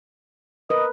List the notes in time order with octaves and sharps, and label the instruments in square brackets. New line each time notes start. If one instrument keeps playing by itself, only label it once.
[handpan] A#4 B4 [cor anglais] D#5